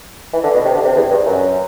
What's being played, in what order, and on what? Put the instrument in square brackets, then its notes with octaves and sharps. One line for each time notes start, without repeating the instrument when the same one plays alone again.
[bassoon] E3
D3
B2
C3
D3
C3
E2
G2
F#2